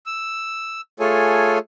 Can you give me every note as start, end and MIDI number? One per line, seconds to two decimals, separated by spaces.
0.06 0.81 88
1.00 1.58 57
1.00 1.58 65
1.00 1.58 68
1.00 1.58 69
1.00 1.58 73
1.00 1.58 80